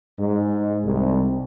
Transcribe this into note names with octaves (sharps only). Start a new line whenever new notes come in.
G#2
C2